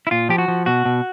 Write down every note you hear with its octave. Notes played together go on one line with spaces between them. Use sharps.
E4
A#2 F4
F3 G4
F#4
F3
B2 F#4
B2